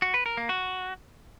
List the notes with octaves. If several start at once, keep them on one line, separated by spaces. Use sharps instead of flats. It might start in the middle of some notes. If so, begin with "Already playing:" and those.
F#4
B4
A#4
A#3
F#4